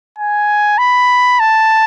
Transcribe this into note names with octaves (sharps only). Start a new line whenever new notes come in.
G#5
B5
A5